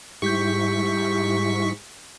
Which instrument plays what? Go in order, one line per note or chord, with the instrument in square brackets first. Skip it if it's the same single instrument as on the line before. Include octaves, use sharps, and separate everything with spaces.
[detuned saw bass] G#2 [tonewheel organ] G3 E4 [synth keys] G4 G6 [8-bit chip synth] C#6 B6